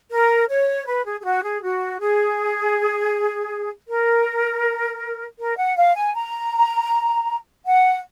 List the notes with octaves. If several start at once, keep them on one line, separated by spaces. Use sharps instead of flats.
A#4
C#5
B4
G#4
G#4
F#4
G#4
F#4
G#4
A#4
A#4
F#5
F5
G#5
A#5
F#5